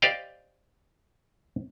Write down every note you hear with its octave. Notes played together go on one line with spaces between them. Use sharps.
G4 C5 D5 D#5 F5 G5